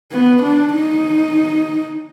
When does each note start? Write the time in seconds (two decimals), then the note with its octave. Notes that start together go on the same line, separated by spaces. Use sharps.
0.11 B3
0.42 D4
0.73 D#4